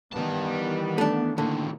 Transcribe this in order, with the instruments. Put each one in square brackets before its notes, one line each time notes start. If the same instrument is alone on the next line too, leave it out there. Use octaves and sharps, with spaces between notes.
[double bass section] D#3 E3 B3 [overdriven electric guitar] G3 A5
[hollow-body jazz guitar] A3 D4
[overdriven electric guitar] A2 D#3 [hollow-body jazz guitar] D3 [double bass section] A#3